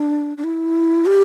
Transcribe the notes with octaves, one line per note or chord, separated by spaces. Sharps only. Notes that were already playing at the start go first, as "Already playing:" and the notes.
Already playing: D4
D4
E4
G4